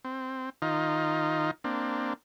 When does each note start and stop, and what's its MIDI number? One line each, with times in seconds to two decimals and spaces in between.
0.05 0.50 60
0.62 1.51 51
0.62 1.51 63
0.62 1.51 65
1.64 2.13 58
1.64 2.13 60
1.64 2.13 62